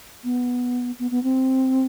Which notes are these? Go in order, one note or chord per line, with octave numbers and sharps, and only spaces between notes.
B3
B3
B3
C4